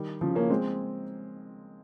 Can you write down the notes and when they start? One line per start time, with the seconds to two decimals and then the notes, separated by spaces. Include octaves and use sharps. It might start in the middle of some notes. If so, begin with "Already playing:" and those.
Already playing: D#3 G3
0.21 C#3 F3
0.35 A#3 C#4
0.50 G#3 C4